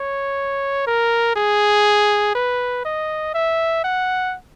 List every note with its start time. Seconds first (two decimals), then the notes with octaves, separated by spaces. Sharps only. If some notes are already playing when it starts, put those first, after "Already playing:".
Already playing: C#5
0.86 A#4
1.36 G#4
2.35 B4
2.85 D#5
3.34 E5
3.84 F#5